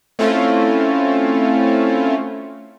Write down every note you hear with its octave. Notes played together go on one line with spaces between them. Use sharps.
A3 C4 C#4 E4 F4